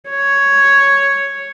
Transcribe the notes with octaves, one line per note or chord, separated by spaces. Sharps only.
C#5